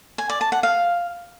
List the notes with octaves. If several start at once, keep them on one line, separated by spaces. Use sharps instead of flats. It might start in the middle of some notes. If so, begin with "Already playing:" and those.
G#5
D5
A5
F#5
F5